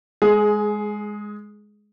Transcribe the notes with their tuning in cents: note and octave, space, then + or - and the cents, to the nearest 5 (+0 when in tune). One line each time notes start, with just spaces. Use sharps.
G#3 +0 G#4 +20